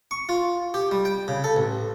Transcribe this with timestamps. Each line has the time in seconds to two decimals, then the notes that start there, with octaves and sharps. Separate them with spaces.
0.11 C#6
0.29 F4
0.74 G4
0.91 G3
1.05 G5
1.28 C#3
1.44 A4
1.56 A1